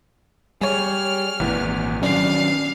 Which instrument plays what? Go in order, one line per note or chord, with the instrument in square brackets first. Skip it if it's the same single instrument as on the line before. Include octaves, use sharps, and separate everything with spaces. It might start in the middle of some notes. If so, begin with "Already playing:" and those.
[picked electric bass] G3 [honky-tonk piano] G#4 C#5 [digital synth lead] G#5 [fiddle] F6
[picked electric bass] G#1 A#2 [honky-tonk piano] E2 E3
[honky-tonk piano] G2 D4 [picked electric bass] D#3 F#3 [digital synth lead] C#4 [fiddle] F5